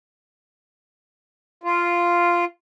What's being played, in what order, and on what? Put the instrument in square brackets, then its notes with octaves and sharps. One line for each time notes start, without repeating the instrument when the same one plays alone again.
[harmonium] F4